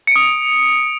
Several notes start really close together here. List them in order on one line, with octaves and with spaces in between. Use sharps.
C#7 D7 D#6